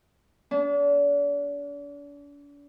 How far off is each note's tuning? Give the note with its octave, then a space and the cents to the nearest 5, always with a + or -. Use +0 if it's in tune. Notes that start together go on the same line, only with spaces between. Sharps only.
D4 -40